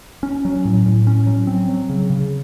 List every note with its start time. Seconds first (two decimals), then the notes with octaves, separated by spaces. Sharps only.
0.23 C#4
0.45 F#3
0.65 A2
0.86 A2
1.07 C#4
1.27 F#3
1.47 C4
1.69 F#3
1.89 C#3
2.10 C#3